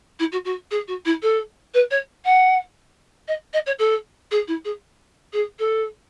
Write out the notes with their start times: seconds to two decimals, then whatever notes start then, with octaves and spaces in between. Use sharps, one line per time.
0.19 E4
0.32 F#4
0.45 F#4
0.71 G#4
0.87 F#4
1.05 E4
1.22 A4
1.74 B4
1.91 C#5
2.25 F#5
3.28 D#5
3.53 D#5
3.66 C#5
3.79 A4
4.31 G#4
4.47 E4
4.65 G#4
5.33 G#4
5.59 A4